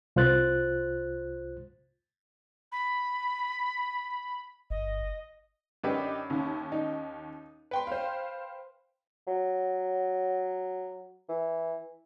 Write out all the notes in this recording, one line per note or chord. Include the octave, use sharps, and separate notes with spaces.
C2 F4 C5 F#6 A6
B5
G1 D#5
F#2 D3 D4 D#4 G4 B4
D#2 C#4
D#4
B4 G5 C6
C5 F5
F#3
E3